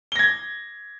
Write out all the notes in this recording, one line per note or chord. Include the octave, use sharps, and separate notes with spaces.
G#6 A#6 G7